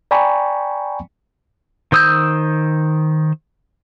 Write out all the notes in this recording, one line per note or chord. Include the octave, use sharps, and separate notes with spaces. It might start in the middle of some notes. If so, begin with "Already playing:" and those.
D5 G5 G#5 A#5 B5 C#6
D#3 C5 D#6 E6 G6